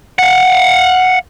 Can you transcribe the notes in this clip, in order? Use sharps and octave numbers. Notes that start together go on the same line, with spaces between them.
F5 F#5